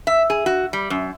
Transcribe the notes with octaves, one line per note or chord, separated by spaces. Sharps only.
E5
G#4
F#4
G3
F#2